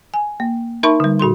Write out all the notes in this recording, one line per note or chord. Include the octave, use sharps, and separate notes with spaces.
G#5
A#3
D#4 A#4 E5 A5 B5 C#6
D3 G3
A#2 F#4 A4 C6